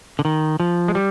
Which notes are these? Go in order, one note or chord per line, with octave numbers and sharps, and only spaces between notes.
D3
D#3
F3
G#3
G3